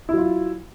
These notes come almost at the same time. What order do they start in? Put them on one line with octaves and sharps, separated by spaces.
E4 F#3 F4